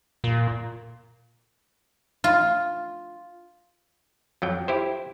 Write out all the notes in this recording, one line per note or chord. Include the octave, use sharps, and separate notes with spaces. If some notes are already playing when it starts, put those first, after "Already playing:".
A#2
F4
F2 F#3 G5
E4 G4 C5